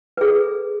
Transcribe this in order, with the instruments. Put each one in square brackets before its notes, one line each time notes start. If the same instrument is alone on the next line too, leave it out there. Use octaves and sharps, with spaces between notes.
[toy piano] B4
G#4
A4